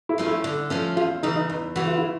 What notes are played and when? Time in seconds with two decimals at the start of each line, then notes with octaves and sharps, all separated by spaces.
0.09 E4
0.18 F3 A3 C#4
0.27 E4
0.44 D3
0.70 F3 A3 C#4
0.97 E2 F4
1.23 C#3 E3 D#4
1.36 D#4
1.50 E2 D#4
1.76 C#3 E3 F#4
1.87 F4
1.98 E4